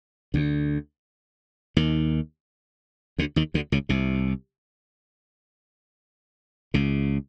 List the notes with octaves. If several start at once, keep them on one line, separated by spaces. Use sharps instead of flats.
D2 D3
D#2 D#3
D2 D3
D#2 D#3
D2 D3
C#2 C#3
C2 C3
C#2 C#3